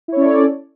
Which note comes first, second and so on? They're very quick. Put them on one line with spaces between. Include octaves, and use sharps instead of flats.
E4 C#5 C#4 D5 A4